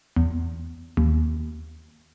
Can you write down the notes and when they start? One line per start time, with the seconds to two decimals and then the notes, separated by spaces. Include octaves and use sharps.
0.16 E2
0.97 D#2